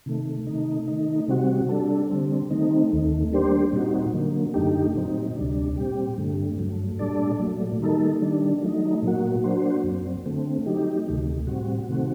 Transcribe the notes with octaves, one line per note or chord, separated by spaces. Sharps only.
C3 D#3 A3
C3 D#3 A3 D#4
D#3 A3 D#4
C3 G3 C4 F#4
G3 D4 A4
D3 G3 C4
D#3 A3 C4 D#4
D#2 D#3 A3
G3 A#3 D4 G4 C5
A#2 G3 C4 D#4 F#4
D3 F#3 A#3
F#2 D3 A3 D#4 G4
A#2 F#3 C4 D#4
D2 C3 G3 D4
A#2 G3 C4 G4
G2 D3 A3
G2 F#3 A3
A#2 G3 D4 A4 D5
A#2 F#3 A3
D#3 G3 A#3 D#4 A4
D#3 G3 D4
F#3 A3 D#4
A#2 F#3 A#3 F#4
F#3 A#3 D4 F#4 C5
F#2 F#3 C4
D3 A3 C4
F#3 A3 D#4 G4
D2 C3 D#3 A3
A2 G3 C4 F#4
C3 D#3 A3 C4 F#4